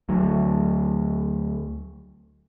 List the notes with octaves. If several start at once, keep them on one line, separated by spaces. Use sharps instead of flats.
D2 F#3